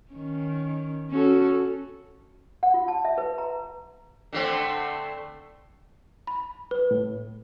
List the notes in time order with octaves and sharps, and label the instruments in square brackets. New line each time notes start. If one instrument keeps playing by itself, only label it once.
[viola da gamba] D#3 C#4
C#4 F#4 A4
[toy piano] F#5
F4
A5
E5
B4
A#5
[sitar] D3 A3 C4
[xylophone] B5
B4
[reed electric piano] A2